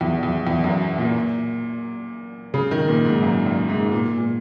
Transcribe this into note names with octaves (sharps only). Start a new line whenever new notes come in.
E2
E2
E2
F#2
A#2
C#3
D#3
A#2
G#2
F#2
F#2
G#2
A#2
A#2